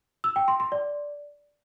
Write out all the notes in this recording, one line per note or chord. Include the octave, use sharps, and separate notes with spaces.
E6
G5
C6
C6
D5